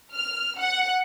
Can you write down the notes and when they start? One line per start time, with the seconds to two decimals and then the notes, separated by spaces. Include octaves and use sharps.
0.14 F6
0.58 F#5